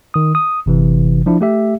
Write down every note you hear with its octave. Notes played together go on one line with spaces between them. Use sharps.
D#3 D#6
D#6
G1 C3 E3
F3 D4 E4
A3 G4 E5